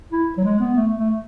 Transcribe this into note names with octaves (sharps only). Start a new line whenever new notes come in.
E4
F#3
G#3
B3
A3
A3